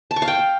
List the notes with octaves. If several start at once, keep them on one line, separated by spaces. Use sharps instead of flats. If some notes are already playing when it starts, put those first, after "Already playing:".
A5
C#6
F5
G5